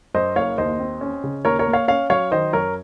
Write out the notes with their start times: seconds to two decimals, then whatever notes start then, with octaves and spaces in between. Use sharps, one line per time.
0.14 F#2 C5 D#5
0.36 F#1 C#5 F5
0.58 D#2 C5 D#5
0.80 C4
1.01 C#4
1.24 C#3
1.45 D#2 A#4 C#5
1.59 A#4 C#5
1.67 A#3
1.73 C#5 F5
1.88 C#4 C#5 F5
2.10 F#3 C#5 F5
2.32 D#3 C5 D#5
2.53 F#2 A#4 C#5